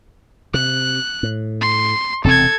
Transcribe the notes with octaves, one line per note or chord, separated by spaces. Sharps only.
C3 F#6
A2
C6
E1 C3 C4 A4 G#6